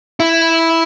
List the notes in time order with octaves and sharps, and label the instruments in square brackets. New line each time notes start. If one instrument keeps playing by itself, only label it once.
[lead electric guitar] E4